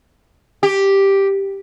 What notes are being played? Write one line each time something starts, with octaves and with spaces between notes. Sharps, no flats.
G4